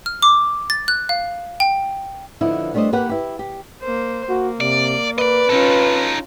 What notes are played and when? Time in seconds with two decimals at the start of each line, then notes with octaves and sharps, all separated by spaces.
0.06 F6
0.22 D6
0.70 A6
0.88 F#6
1.09 F5
1.60 G5
2.41 D3 F3 B3 D#4 E4
2.74 G3 A3 D4 A#4 C5 D#5
2.92 A#3 G4 A#4 B4 F#5
3.09 E4 G4
3.39 G4
3.82 A#3 C5
4.29 A#3 F#4
4.61 C3 D5
5.18 B4 D5 D#5
5.50 C#4 D#4 F4 A4